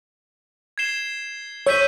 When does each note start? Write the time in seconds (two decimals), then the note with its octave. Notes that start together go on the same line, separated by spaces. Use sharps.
0.78 G#6 C7 E7 G7
1.66 C#5 E6 G6 B6 D#7